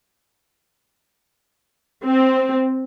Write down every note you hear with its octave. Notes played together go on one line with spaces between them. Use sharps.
C4